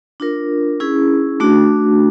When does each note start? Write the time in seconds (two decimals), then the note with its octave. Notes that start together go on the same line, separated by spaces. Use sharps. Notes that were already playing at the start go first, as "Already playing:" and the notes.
0.20 D4 F4 A#4
0.80 C#4 E4 G#4
1.40 A3 D4 F#4